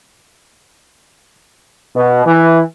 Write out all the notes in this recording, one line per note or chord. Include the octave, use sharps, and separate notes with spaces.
B2
E3